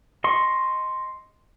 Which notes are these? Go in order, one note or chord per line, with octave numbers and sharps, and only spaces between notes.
D#5 C6 C#6